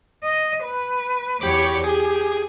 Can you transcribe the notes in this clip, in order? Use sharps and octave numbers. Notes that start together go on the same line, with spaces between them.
D#5
B4
E2 G4 C#5 B5 D6
G4 G#4